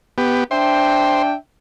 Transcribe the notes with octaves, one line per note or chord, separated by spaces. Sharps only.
B3 G4
D4 C5 E5 G5